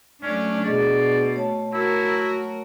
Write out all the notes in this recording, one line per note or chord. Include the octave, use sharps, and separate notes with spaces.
F#3 A3 C#4 D4
B2 D4 G#4 D5 D#5
A3 C#5 A5
E4 F#4 A#4